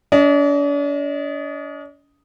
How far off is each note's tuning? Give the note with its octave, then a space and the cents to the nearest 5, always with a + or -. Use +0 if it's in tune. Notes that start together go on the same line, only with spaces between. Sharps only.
D4 -45 D#5 +0